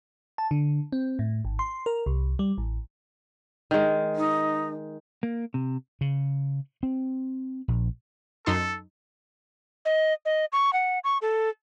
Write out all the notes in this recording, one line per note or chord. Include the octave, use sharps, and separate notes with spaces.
A5
D3
C4
A2
G#1
C6
A#4
C2
G3
A1
D#3 G#3
D#4
A#3
C3
C#3
C4
A#1
F#2 D#4 A4 C6
D#5
D#5
C#6
F#5
C#6
A4